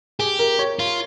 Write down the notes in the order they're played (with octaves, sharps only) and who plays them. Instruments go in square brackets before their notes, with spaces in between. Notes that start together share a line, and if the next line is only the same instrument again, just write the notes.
[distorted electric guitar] G4 [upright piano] G#4
[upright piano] A#4
C#5
[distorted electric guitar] F4